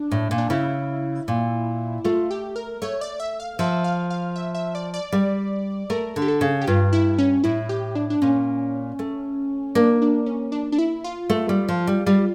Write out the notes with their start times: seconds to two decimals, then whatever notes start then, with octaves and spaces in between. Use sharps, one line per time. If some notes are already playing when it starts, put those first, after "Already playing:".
Already playing: D4
0.11 A2
0.31 A#2
0.38 D4
0.50 C#3 E4
1.28 A#2
2.04 A3 F4
2.31 G4
2.56 A#4
2.82 A3 C#5
3.01 D5
3.20 E5
3.40 F5
3.59 F3 E5
3.84 F5
4.10 F5
4.36 E5
4.55 E5
4.75 D5
4.94 D5
5.12 G3
5.90 A3 A#4
6.16 D3
6.22 G4
6.28 A4
6.41 C#3
6.61 G4
6.67 G2 F4
6.93 E4
7.18 C#4
7.44 A2 E4
7.69 G4
7.95 D4
8.10 D4
8.22 A#2 C#4
8.99 A3
9.75 A#3 D4
10.02 D4
10.26 C#4
10.52 D4
10.72 D4
10.78 E4
11.04 F4
11.30 A3
11.49 G3
11.69 F3
11.87 G3
12.06 G3 F4